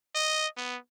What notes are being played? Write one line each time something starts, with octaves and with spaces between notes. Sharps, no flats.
D#5
B3